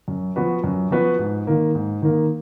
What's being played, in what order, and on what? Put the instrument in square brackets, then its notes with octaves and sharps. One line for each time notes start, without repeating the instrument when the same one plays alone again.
[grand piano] F#2
F3 B3 F#4 B4
F#2
F3 B3 F#4 B4
G#2
D#3 A#3
G#2
D#3 A#3